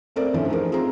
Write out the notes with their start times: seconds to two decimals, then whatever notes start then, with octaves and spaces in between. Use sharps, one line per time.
0.16 A3 C4 A#4 D5
0.34 E3 F3 A3 C#4 D4
0.48 F3 D#4 G#4 A#4
0.72 C4 F4 G#4 A#5